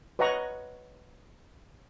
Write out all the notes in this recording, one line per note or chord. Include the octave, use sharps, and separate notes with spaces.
B4 C#5 D#5 F#5 A#5 C#6